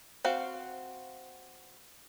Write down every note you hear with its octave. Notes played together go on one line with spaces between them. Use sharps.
C4 F#4 F5